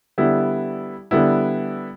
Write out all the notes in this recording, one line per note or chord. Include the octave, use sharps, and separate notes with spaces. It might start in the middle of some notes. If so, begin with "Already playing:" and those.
D3 G3 B3 E4
D3 G3 B3 E4